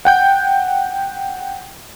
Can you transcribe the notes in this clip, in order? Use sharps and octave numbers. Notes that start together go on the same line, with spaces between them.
F#5 G5 G6